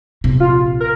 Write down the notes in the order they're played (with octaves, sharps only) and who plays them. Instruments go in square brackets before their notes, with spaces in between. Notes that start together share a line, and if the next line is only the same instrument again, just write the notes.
[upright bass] A#1 C3
[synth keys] F4
A#4